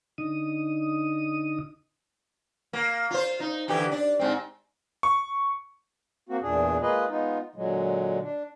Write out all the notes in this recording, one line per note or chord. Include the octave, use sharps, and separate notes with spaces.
D3 D#4 D#6
A#3
F4 C5
D#4
D3 E3 G4
D4
G#2 C4
C#6
A#3 C4 F#4
E2 A#2 D4 G#4
G#3 A#3 F4 G#4 B4 D#5
G#3 B3 D#4 F4
A#2 D3 F#3 G#3
D4